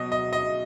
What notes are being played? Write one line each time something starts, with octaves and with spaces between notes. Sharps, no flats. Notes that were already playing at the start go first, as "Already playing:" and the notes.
Already playing: B2 F#3 D#5
D#5
D#5